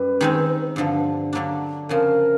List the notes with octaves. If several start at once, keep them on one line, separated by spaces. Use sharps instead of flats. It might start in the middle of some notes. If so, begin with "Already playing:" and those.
Already playing: F#2 G3 B4
D#3 G#3 C4
G2 D3 F3
D3 F#3 A#3 D4
F2 C#3 F3 A#4